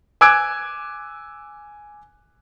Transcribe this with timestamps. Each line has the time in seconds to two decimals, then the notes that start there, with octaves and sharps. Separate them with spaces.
0.21 G#5 D6 E6 F#6 G#6 D7